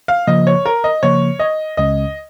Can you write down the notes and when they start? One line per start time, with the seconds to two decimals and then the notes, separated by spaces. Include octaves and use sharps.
0.08 F5
0.27 C#3 F3 A#3 D#5
0.47 C#5
0.66 A#4
0.84 D#5
1.03 C#3 F3 A#3 C#5
1.39 D#5
1.77 C#2 C#3 G#3 C#4 D#5